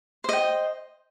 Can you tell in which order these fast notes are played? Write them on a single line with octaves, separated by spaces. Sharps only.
C5 D#5 G5